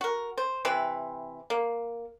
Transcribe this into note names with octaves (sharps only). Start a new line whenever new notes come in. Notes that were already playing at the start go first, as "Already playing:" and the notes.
F#4 A#4
C5
C3 E3 C4 B4
A#3